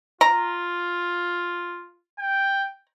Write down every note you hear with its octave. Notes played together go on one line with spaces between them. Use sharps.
F4 A#5
G5